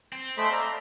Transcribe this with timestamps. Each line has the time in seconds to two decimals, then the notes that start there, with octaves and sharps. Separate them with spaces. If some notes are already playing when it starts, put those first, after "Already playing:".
0.13 C4
0.38 G#3 A3 G#4 C5 B5
0.52 D5 E5 F5 A#5